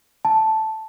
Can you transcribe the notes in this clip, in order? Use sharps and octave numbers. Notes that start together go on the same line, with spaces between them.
A5